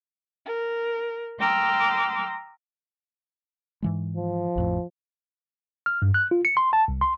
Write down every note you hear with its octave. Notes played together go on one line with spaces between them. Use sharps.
A#4
G5 A#5 C6 D6 E6 F6
G#2 E3 G#3
F3
A1 F2 A2
F6
G2
F#6
F4
C#7
C6
A5
C2
C6